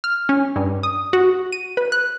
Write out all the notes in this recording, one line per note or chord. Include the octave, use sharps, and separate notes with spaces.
F6
C#4
G2
D#6
F#4
D#7
B4
F#6